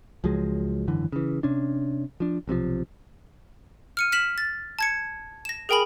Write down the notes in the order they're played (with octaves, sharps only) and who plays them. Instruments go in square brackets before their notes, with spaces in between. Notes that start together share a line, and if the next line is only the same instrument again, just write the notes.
[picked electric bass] C#2 F3 F#3 G#3
G#1 F#2 D3 E3
C#3 E3
C3 C#4 D4
F3 D4
B1 C3 E3 F3
[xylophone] F6 C#7 D#7
F6 B6 E7 F#7
A6
A5 G#6 C#7
A#6 E7
G#4 A#4 G5 G#5 B5 F#7